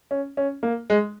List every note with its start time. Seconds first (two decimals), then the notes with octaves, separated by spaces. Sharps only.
0.11 C#4
0.37 C#4
0.63 A#3
0.90 G#3